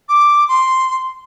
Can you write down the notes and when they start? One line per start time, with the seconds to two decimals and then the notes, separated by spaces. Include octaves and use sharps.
0.09 D6
0.48 C6